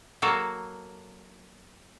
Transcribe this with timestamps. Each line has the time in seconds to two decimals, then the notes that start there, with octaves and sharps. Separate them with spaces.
0.22 F#3 A#3 F#4 A4